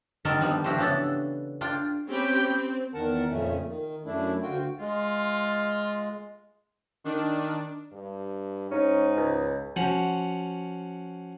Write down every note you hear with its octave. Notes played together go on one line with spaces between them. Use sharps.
D3 D#3 G3 C4 A4 A#4
F3 G3 B3
F3 E4 F#4 G4 C5
C#3 E3 B3 D4 A4
D4 F4 G5
C4 C#4 G4 G5 B5
C4
E2 D#3 A#4 F#5 A5
F2 A#2 C#3 A3 C#4
D#3
F#2 A3 D4 E4
D2 F4 F#4 G5
G#3 F4
D#3 D4
G2
G#2 C#4 D#4
C#2
F3 C#4 F#4